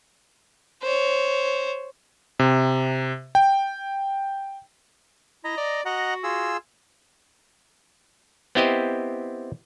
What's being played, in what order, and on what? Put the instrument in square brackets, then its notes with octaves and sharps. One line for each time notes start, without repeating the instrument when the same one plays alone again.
[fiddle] C5 C#5
[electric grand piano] C3
G5
[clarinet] E4 [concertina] D#5 A#5
[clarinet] D5
[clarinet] F#4 [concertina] D#5 F#5 A#5
[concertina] F4 G#4 E6
[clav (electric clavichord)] B3 C4 E4 G4 C5 D#5